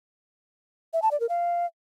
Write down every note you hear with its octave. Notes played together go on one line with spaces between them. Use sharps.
E5
A5
D5
A#4
F5